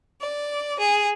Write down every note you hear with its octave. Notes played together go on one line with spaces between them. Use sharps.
D5
G#4